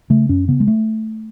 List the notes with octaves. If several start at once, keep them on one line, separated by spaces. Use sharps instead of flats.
C#3 A3
F#2 C#4
C#3 B3
G#3
A3